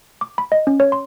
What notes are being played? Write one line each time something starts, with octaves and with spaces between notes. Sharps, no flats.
D6
B5
D#5
C#4
C#5
C6